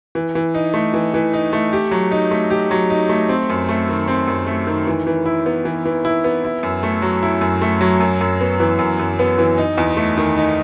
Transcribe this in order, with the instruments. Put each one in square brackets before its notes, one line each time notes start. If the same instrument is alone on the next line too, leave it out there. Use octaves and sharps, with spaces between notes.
[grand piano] E3
E3
D#4
A3
E3
E3
D#4
A3
G4
F#3
D#4
A3
G4
F#3
D#4
A3
C4
F#2
A3
D#3
C4
F#2
A3
D#3
E3
E3
E4
B3
E3
E3
E4
B3
E4
F#2
A3
F#3
E4
F#2
A3
F#3
F#2
F#2
B3
E3
F#2
F#2
B3
E3
D#4
E2
A3
D#3
D#4